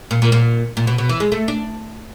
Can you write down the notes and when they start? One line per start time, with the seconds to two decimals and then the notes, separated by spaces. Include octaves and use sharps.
0.11 A#2
0.22 A#2
0.32 A#2
0.77 A#2
0.87 B2
0.98 B2
1.09 E3
1.20 G#3
1.32 A3
1.48 D4